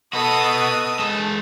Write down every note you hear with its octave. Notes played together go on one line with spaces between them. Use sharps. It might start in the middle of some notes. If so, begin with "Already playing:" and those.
B3 F#4 A4 D#5 D#6
G#3 A5